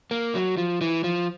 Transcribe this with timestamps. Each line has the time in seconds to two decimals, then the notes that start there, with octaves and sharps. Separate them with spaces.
0.11 A#3
0.35 F#3
0.58 F3
0.81 E3
1.04 F3